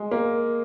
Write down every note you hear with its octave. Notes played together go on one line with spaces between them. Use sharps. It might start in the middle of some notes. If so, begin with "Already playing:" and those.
Already playing: G#3
A#3